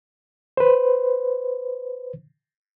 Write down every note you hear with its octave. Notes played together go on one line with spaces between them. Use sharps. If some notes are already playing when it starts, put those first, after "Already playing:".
B4 C5